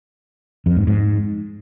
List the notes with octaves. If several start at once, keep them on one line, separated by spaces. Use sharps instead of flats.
F2
G#2
G#2